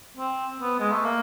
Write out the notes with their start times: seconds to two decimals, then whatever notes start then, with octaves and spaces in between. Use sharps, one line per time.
0.18 C4
0.62 B3
0.79 G#3
0.92 A3
1.05 A#3